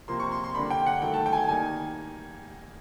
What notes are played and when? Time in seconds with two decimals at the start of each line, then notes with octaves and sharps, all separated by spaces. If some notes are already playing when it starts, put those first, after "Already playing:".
0.08 C3 F3 A#3 C6
0.20 C#6
0.31 C6
0.44 C6
0.55 D3 G3 A#3 D4 B5
0.70 G5
0.86 F#5
1.02 D#3 F#3 A3 G5
1.14 A5
1.26 G5
1.33 G#5
1.38 G5
1.48 D#3 G3 A#3 D#4 G#5